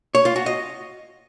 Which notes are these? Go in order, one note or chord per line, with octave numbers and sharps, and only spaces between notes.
C#5
F4
F#4
D#5